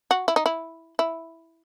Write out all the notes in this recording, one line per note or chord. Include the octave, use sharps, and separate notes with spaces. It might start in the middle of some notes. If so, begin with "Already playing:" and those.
F#4
E4
D#4
E4
E4